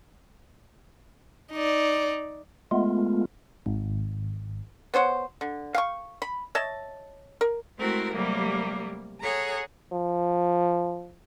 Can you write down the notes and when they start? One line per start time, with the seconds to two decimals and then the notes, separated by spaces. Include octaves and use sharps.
1.53 D#4 D5
2.71 G#3 A3 B3 F4
3.66 G#1
4.94 B3 C5 C#5 F#5
5.41 D3
5.74 F5 G5 C#6
6.22 B5
6.55 C#5 D#5 E5 A5
7.41 A#4
7.79 G#3 A3 C4 E4 F#4 A#4
8.14 C3 F#3 G3 A3 A#3
9.21 G#4 A4 C#5 F#5 A#5
9.92 F3